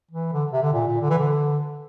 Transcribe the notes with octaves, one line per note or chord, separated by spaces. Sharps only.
E3
D3
C3
D3
A#2
A#2
D3
E3
D3